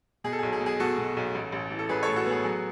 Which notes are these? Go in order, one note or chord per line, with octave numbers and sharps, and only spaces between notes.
B2 G#4
A4
B1 G#4
G#4
B2
G#4
B2 F#4 A4
B2
B1
A1
A1
E3
A4
A1 G#4 B4
A4 C#5
A2
F#4 A4
B3 G#4
F#3 G#4